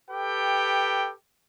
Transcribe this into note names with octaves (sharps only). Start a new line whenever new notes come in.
G4 A4 B4 G5